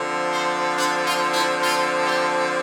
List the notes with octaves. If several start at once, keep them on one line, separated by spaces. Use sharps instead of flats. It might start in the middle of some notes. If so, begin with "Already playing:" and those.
Already playing: D3 F3 C4
C5
D4
F4
E4
F4
G4